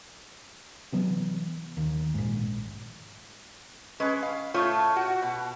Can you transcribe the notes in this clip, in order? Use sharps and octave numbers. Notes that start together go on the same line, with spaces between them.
C3 E3 F#3 B3
D#2
A#1 G#2
G#3 C#4 B4
F5
A2 A3 F4 C#5
F#4
B2